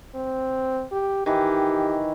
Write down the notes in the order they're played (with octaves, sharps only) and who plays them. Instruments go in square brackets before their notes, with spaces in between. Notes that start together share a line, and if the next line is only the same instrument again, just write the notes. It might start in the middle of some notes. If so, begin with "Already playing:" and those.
[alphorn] C4
G4
[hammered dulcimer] D#3 E3 [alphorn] G4